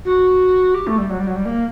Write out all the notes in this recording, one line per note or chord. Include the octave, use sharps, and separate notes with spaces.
F#4
G4
A3
G3
F#3
G3
F#3
G3
A#3